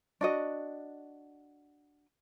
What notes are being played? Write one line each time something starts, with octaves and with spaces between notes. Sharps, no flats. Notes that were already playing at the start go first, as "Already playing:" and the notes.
D4 F#4 D#5